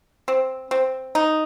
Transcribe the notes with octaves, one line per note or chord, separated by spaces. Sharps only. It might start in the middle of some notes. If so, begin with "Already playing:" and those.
C4
C4
D#4